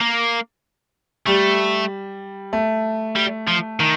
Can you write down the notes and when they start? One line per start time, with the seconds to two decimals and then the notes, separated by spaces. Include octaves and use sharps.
0.01 A#3
1.26 G3 A3
2.53 A3
3.16 G3
3.48 F3
3.80 D#3